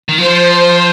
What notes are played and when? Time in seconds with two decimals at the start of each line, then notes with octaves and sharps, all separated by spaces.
0.09 D#3
0.18 F3 C5